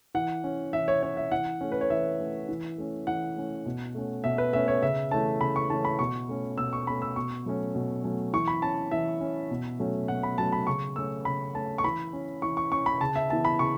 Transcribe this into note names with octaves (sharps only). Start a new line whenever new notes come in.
E3 F#5
C#4
E3 E5
C#5
C#4 C#5
E5
E3 F#5
A3 C#4
B4
C#5
E3 E5
A3 C#4
E3
A3 C#4
E3 F#5
A3 C#4
B2
A3 C#4
B2 E5
B4
A3 C#4 E5
C#5
C#3 E5
E3 A3 C#4 A5
C#3 B5
C#6
E3 A3 C#4 A5
B5
B2 C#6
A3 C#4
B2 E6
C#6
A3 C#4 B5
E6
B2 C#6
F#3 A3 C#4
B2
F#3 A3 C#4
E3 C#6
B5
C#4 A5
E3 E5
C#4
B2
F#3 A3 C#4
B2 F#5
B5
F#3 A3 C#4 A5
B5
C#3 C#6
A3 C#4 E6
C#3 B5
A3 C#4 A5
C#6
E3 B5
C#4
E3 C#6
C#6
C#4 C#6
B5
C#3 A5
E5
E3 B3 A5
B5
C#3 C#6